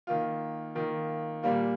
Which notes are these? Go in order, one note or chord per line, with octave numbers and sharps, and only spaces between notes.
D#3 A#3 F4
D#3 A#3 F4
A#2 G3 A#3 F4